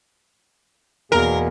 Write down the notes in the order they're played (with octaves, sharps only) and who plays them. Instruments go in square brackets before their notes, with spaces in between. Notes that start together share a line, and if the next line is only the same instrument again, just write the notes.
[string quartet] E2 [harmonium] B2 A#3 G#4 [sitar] A#4